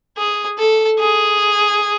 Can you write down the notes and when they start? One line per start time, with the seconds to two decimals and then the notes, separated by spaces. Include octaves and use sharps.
0.17 G#4
0.58 A4
0.99 G#4